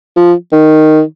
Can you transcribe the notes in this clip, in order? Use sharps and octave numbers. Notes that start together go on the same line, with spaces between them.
F3
D#3